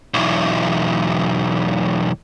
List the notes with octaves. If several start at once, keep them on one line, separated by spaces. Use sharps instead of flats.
B1 E2